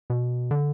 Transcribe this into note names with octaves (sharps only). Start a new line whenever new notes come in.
B2
D3